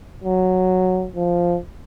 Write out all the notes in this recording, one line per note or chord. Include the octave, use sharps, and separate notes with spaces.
F#3
F3